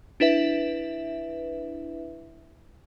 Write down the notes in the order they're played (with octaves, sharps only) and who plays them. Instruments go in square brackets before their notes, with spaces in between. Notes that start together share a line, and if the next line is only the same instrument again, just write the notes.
[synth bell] D4 E4 B4 E5